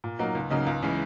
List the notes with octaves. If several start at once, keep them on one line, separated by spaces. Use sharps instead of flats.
A#2
F#3 A#3 D#4
C#2
C#3 F#3 A#3 D#4
C#2
C#3 E3 G#3